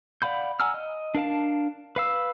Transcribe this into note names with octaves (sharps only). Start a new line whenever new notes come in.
D5 F5 F#5 B5 G6
F#5 G#5 A#5 E6 F6
D#5
D4 A#4 F5 A5
B4 F5 E6